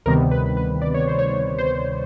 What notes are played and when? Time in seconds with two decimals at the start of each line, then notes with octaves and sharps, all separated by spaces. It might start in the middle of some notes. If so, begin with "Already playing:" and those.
0.06 D2 C3 D#3 G3 B3 A#4
0.31 B4
0.57 B4
0.81 D5
0.94 C#5
1.08 C5
1.19 C#5
1.58 C5